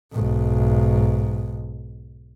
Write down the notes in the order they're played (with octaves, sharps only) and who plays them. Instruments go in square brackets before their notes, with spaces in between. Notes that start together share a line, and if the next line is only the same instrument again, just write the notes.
[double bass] B1 G#2